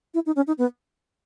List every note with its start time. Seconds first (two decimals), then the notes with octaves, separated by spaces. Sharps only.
0.14 E4
0.26 D#4
0.36 C#4
0.47 D#4
0.58 B3